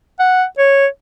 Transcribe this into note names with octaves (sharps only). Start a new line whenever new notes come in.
F#5
C#5